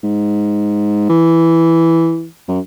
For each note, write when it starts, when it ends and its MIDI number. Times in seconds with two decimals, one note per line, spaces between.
0.03 1.07 44
1.09 2.26 52
2.48 2.60 42